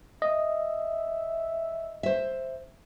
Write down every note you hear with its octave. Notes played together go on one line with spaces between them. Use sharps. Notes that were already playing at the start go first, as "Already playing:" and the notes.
D#5 E5
C5 E5